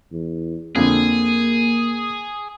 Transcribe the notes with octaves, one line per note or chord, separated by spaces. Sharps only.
E2
F2 D3 A#3 G#4